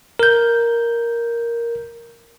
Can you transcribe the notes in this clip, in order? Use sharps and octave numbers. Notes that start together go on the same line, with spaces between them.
A#4 G6